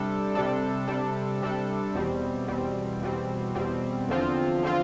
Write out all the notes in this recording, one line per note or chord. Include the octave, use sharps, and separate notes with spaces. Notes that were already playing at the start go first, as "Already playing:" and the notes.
Already playing: C3 G3 D4 A4
C3 G3 D4 A4
C3 G3 D4 A4
C3 G3 D4 A4
E2 B2 G3 C4
E2 B2 G3 C4
E2 B2 G3 C4
E2 B2 G3 C4
E2 D3 F3 C4 F4
D3 F3 C4 F4